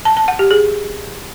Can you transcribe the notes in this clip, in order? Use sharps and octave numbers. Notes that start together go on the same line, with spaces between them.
A5
A5
F#5
G4
G#4